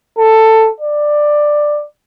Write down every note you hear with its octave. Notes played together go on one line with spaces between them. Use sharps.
A4
D5